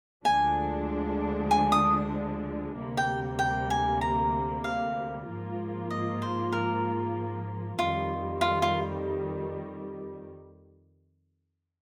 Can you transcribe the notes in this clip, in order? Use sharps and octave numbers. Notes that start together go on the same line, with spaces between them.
D2 D3 F3 G#3 D4 G#5
G#5
D#6
D2 C3 G3 A#3
G5
G5
G#5
A#5
F5
G#2 F3 A#3 F4
D#5
C5
A#4
F2 D#3 G3 F4
F4
F4